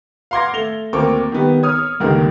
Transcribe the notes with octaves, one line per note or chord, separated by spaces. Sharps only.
F5 F#5 C6 D6 G#6 A#6
A3 F7 G7
D2 A#3 C4 A#4 C#6 D6
D#3 G3 B3
C#5 D#6 F6
C#2 G2 D3 D#3 A#3